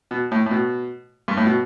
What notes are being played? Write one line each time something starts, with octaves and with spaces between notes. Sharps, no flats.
B2
A2
A2
B2
G2
A2
B2